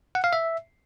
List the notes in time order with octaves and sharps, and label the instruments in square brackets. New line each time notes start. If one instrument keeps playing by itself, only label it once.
[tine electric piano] F#5
F5
E5